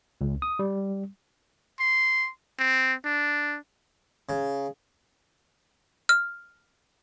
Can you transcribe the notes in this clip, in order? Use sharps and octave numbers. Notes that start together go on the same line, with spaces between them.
C#2
D#6
G3
C6
C4
D4
C#3
F6